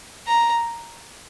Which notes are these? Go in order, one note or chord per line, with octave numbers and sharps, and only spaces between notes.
A#5